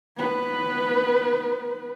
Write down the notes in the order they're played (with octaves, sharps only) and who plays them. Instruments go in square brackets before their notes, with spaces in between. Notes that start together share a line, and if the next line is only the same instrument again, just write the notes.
[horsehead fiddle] B3 B4